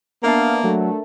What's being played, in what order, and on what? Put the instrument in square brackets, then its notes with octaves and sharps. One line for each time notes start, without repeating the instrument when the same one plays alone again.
[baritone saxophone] A#3 [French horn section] B3 D4 [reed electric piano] A#4 E5 A5 [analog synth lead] F5
[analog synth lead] F#3 [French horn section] A3 D4